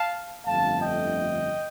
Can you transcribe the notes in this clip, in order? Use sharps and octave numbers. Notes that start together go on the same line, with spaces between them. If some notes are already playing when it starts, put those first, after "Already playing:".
Already playing: F5 A5
G1 F2 D3 A3 F5 A5
D#5 G5